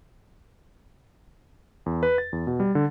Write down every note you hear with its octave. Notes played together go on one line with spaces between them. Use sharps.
E2
B4
A6
E2
B2
G3
D3